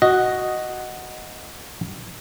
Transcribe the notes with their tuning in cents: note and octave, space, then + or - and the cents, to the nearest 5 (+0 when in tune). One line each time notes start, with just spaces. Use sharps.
F#4 +0 D#5 +0